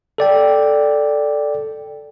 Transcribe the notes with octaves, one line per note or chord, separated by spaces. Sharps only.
A4 D5 G5